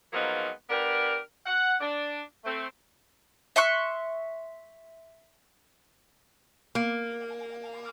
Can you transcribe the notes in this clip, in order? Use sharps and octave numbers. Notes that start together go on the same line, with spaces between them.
F3 F#3 G#3 A#3 B3 D#4
B3 D4 G4 A#4
F#5
D4
A3 C4
E5 C6 C#6 F#6
A#3